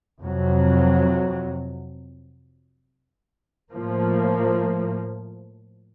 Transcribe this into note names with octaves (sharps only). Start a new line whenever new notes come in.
F2 C3 F#3
A2 F3 A#3